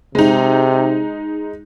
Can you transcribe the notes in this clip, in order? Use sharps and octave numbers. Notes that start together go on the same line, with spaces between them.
C3 G#3 D#4